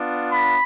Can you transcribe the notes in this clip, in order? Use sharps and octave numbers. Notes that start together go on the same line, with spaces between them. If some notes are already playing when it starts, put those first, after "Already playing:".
Already playing: B3 D4 F4
B5